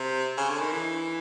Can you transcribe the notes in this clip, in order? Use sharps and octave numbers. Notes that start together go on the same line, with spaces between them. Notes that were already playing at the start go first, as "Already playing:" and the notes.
Already playing: C3
C#3
D3
D#3
E3